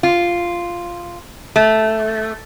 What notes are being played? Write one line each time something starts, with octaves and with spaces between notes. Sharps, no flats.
F4
A3